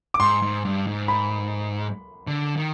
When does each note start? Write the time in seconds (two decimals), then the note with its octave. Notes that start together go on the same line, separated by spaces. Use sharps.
0.14 D6
0.20 G#2 C6
0.42 G#2
0.65 G2
0.87 G#2
1.08 B5
2.27 D3
2.57 D#3